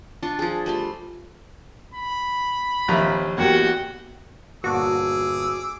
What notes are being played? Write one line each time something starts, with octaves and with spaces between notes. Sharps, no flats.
D4 F4 C#6
F3 G#4
G3 A3 C6
B5
A#1 D#2 F3 C4 E5 A#5
E2 A#3 E4 F#4 G4 G5
G1 A#2 F#4 G#4 A5 D6 E6